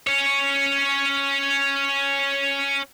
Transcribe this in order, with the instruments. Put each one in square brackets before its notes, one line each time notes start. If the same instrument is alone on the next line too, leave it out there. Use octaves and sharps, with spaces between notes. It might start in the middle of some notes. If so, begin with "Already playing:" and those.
[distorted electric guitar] C#4 C#5